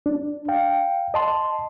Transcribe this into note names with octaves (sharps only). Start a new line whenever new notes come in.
D4
F5 G5
D#5 A5 C6